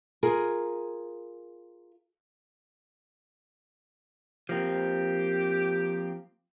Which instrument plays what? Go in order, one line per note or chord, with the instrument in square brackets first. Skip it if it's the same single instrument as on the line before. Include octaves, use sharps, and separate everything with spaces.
[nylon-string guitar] F4 G#4 A#4
[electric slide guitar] F3 A#3 C4 [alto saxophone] G4